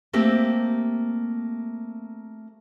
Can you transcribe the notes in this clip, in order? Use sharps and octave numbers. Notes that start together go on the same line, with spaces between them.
A3 A#3 C4 G4 C5